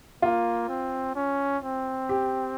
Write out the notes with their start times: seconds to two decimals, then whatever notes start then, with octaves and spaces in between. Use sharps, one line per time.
0.22 A#3 F4
0.68 C4
1.15 C#4
1.63 C4
2.09 G4